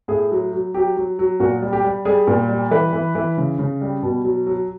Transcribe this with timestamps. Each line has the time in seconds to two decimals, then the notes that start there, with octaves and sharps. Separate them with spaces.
0.08 A2 G#4
0.31 F#3
0.53 F#3
0.74 F#3 G4
0.97 F#3
1.19 F#3
1.40 A#2 F#4
1.62 G3
1.73 G4
1.84 G3
2.05 G3 G#4
2.27 A#2
2.49 G3
2.71 E3 B4
2.93 E3
3.15 E3
3.38 C#3
3.59 C#3
3.81 G3
4.03 B2
4.24 F#3
4.46 F#3